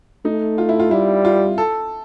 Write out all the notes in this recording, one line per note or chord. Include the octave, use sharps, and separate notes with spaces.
A3 D#4
F4
E4
F4
G3 E4
F4
A4